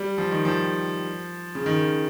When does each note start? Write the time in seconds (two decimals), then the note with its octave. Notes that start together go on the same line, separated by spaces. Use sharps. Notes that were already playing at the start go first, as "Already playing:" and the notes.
Already playing: G3
0.18 F3
0.31 D#3
0.45 F3
1.55 C#3
1.66 D#3